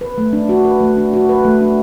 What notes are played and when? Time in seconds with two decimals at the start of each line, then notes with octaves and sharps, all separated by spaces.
0.01 B4
0.18 A3
0.33 D4
0.49 F#4
0.65 B4
0.81 A3
0.97 D4
1.13 F#4
1.29 B4
1.45 A3
1.61 D4